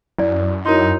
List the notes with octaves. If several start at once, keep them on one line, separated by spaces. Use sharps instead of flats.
F#2 E4 D5
D#4 E4 F#4 A#4 C#5 C6